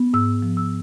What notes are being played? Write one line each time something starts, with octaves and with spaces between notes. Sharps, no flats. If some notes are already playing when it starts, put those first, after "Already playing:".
Already playing: B3
G#2 E6
F3
E6